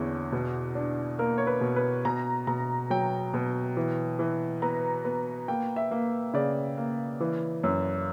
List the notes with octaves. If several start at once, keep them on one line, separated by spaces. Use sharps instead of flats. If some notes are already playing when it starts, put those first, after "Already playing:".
Already playing: E2 D3 C#4
B2
D4
A#3 A#4
C#5
B4
B2
B4
B2 A#5
B2 A#5
F#3 G5
B2
E3
E3
B3 A#5
B3
A#3 G5
E5
A#3
C#3 D5
A#3
E3
F#2